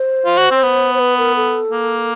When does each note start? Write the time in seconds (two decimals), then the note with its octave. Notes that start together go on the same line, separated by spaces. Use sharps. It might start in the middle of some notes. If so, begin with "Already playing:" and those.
Already playing: C5
0.26 F4
0.38 F#4
0.51 C4
0.63 B3
0.95 C5
1.00 B4
1.18 A#4
1.36 A4
1.72 A#3